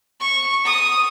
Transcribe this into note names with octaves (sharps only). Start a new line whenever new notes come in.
C#6
D#6